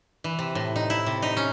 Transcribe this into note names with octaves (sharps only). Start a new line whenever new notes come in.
E3
C3
A2
D#4
E4
C3
D#4
C#4